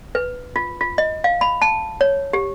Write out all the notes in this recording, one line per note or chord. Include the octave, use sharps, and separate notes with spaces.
B4
F4
F4
D#5
F5
B5
A5
C#5
G4